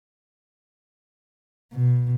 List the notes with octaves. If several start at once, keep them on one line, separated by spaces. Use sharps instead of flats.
B2